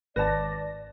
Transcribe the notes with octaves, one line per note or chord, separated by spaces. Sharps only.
G#1 B4 C#5 D5 A5 A#6